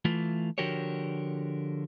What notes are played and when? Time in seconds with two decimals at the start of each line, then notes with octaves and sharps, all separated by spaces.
0.05 E3 A3 F4
0.58 D3 F3 F#4 G4 A#4 C#5